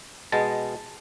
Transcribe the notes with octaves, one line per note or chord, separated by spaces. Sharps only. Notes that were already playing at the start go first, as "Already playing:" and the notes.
B2 G#3 B3 A5